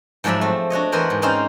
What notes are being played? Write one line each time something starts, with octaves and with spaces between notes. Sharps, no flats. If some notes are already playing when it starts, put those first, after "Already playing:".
G#2 F3 F#3 D5 E5 B5
A3 C4
D4 F#4 C#5 D#5
E2 B3 A#4 C5 F#5 G#5
G#2
C4 C#4 D#4 C5 D5 F5